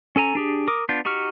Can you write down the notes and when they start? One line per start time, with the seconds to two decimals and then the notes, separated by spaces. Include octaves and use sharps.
0.16 C#4 A4 G#5 A#5
0.35 D4 G4 G#4
0.68 A#4 D6 D#6
0.89 B3 D4 F4 G6
1.05 D#4 F#4 G4 C#6 F6